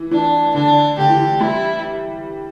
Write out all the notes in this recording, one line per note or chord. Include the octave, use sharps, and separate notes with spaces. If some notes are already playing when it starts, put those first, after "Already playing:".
Already playing: E3
E3 D4
D3 D4
D3 G4
E3
E3
E3 G3 E4